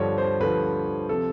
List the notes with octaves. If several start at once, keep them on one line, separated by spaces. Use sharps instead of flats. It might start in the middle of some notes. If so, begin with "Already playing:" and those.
Already playing: G2 D3 F3 C#5
C5
G2 D3 F3 B4
C3 F3 A4